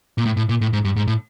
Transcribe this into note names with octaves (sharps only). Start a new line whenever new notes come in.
A#2
A2
A2
A#2
A2
G#2
G2
G#2
A2